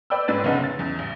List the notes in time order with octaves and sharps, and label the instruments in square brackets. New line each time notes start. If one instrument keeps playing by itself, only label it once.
[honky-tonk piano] B4 D5 G5 B5 E6
G#2 C#4 B4 D5 A6
F1 A#1 C#3 B3 D#4 B4
C#3 A6
E2
A1